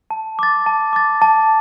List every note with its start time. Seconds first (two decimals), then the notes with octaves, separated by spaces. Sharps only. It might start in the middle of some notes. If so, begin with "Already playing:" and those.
0.11 A5
0.39 D6 A6
0.66 A5
0.93 D6 A6
1.22 A5